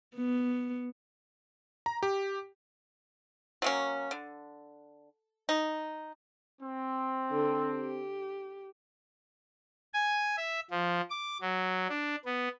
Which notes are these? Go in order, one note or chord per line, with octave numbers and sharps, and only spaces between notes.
B3
A#5
G4
F#3 A#3 C#4
D3
D#4
C4
D3
G4
G#5
E5
F3
D6
F#3
D4
B3